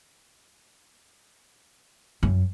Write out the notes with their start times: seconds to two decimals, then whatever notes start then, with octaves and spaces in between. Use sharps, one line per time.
2.23 F#2